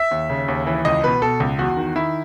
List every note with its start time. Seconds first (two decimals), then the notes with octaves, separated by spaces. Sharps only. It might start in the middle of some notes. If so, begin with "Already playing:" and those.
Already playing: E5
0.11 D#2
0.30 C#3
0.48 D#2
0.67 E3
0.85 C#2 D#5
1.04 B2 B4
1.22 B2 A4
1.40 C#2
1.59 E2 F#4
1.77 D#3
1.96 D#3 E4